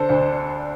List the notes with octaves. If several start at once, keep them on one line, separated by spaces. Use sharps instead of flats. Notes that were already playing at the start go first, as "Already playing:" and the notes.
Already playing: D3 A4 C5
D2